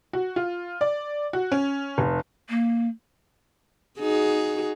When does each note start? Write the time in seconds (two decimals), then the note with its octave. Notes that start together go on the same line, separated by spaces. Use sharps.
0.13 F#4
0.36 F4
0.81 D5
1.33 F#4
1.52 C#4
1.98 F1
2.49 A#3
3.99 D#4 F#4 G#4